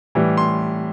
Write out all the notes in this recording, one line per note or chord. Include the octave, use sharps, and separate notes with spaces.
A2 E3 G3
C6